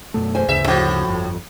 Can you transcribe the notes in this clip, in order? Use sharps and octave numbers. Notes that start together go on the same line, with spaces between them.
F#2 B2 A3
E2 C5 G#5
D2 G2 C#3 E5
A2 F3 F#4
G1 F2